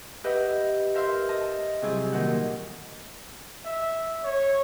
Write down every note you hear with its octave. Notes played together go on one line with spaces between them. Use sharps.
G4 B4 D#5 E5 F#5
A#4 C5 E5 F5 C6
D#5 A5
C3 F#3 G3 E4 G#4
A#2 D#3 F#4 F#5
E5
C#5